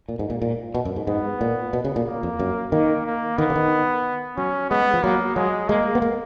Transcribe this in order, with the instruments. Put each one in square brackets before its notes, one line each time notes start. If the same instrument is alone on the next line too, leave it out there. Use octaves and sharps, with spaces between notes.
[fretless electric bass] A#2
G#2
A#2
A#2
B2
F#2
G#2
[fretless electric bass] G#2 [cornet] B3
[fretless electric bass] A#2
B2
C#3
A#2
[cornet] A#3
[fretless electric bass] F2
F#2
[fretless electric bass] D#3 [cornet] A#3
[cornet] A#3
[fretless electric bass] D#3 [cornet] B3
[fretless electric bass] C#3
D#3
[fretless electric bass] F#3 [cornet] C#4
[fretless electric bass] G#3 [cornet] B3
[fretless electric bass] F3
[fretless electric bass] F#3 [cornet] A#3
[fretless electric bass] F#3 [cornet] G#3
[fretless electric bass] G#3 [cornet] A#3
[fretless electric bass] B3
A#3